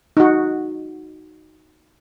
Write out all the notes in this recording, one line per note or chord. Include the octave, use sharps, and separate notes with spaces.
D#4 F#4